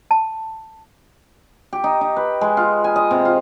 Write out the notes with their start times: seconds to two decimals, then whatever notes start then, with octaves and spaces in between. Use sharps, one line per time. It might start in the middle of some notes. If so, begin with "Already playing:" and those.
0.11 A5
1.73 G4
1.84 D#4
2.01 D#4
2.16 B4
2.41 G#3
2.57 F4
2.84 G#5
2.96 D#5
3.11 C3
3.25 F4